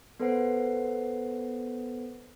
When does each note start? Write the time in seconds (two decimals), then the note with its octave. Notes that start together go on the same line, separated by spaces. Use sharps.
0.20 B3 A4 B4 C5 F#5 C7